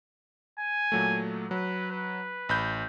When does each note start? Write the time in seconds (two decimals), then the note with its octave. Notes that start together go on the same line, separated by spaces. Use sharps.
0.59 G#5
0.92 A#2 F#3 A3
1.51 F#3 B4
1.91 B4
2.49 A1 B5 G6